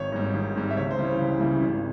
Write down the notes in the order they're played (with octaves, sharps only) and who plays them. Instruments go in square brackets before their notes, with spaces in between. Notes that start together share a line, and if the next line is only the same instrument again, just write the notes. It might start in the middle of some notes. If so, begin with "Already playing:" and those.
Already playing: [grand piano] G#1 C#5
G#2 G3
G#1
G#2 G3
E5
C#2 C#5
C5
C#3 E3 G3
C#5
C#2
C#3 E3 G3
G#1